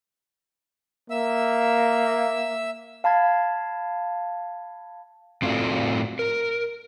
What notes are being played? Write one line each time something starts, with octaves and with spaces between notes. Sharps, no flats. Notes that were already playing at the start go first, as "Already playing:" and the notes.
A#3 E5 E6
F5 A5 B5 G#6
A2 C4 F4 F#4 A4 D5
A#4